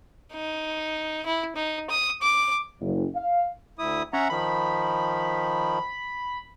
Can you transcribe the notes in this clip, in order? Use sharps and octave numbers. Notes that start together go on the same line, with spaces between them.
D#4
E4
D#4
D#6
D6
F#1
F5
D2 E4 D#6
C#4 E5 F#5 A#5
D#3 F3 B5